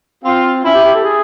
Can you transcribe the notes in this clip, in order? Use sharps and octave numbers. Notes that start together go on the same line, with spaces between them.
C4 F4
C#4 E4
G4
G4
A4
G#4